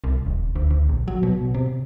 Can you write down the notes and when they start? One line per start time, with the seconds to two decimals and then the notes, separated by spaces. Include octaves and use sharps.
0.04 C2
0.26 D#1
0.55 D2
0.70 D2
0.89 A#1
1.08 F#3
1.23 B2
1.54 C3